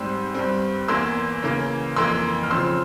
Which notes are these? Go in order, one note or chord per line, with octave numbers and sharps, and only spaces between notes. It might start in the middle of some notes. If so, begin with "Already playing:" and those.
Already playing: G#2 G3 C4 C6 E6
G2 G3 C4
E2 E3 A#3 C6 E6
C#3 E3 A#3
F2 E3 A#3 C6 E6
F6
C#3 F3 C4 C6 E6